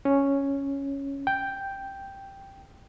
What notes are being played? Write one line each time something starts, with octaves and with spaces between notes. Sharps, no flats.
C#4
G5